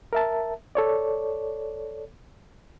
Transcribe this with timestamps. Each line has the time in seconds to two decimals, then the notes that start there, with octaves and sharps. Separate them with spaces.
0.13 A#4 E5 A5
0.75 A4 C#5 D5